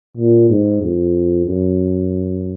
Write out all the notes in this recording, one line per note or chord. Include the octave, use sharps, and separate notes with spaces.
A#2
G#2
F2
F#2